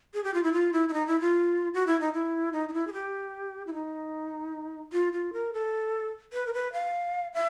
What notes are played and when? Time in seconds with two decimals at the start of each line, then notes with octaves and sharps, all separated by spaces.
0.14 G#4
0.24 G4
0.34 F4
0.43 E4
0.53 F4
0.73 E4
0.89 E4
0.93 D#4
1.07 E4
1.20 F4
1.74 F#4
1.87 E4
2.01 D#4
2.13 E4
2.53 D#4
2.69 D#4
2.73 E4
2.87 G#4
2.93 G4
3.67 E4
3.74 D#4
4.93 F4
5.13 F4
5.33 A#4
5.53 A4
6.33 B4
6.47 A#4
6.54 B4
6.73 F5
7.34 E5